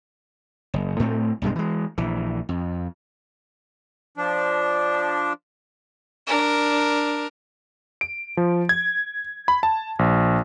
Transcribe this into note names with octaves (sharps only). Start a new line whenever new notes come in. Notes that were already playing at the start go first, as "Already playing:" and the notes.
F#1
A2 A3 C4
B1 G2 C3 G#3
E3 G#3
A#1 E3
F2
F3 D4
D4 A#4
D7
F3
G#6
B5
A5
A#1